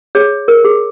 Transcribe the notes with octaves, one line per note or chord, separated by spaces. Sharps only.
G#4 C#5
A#4
G#4